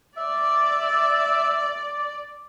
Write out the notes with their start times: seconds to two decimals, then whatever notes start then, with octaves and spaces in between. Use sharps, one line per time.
0.17 D5 E5